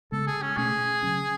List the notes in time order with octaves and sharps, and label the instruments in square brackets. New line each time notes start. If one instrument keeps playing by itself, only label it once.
[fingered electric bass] C#3 G#3 B3 [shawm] A4
[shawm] G#4
C#4
[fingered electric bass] B2 A3 C#4 [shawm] G#4
[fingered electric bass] C#3 F#3 C#4